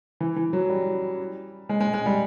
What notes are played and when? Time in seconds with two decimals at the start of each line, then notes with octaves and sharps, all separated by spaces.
0.21 E3
0.36 E3
0.53 F#3
0.69 G3
1.69 G#3
1.81 G#3
1.94 G#3
2.06 G3